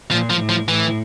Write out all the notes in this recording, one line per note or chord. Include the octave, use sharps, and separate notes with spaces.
A#2 F3
F3
A2
F3
A2 E3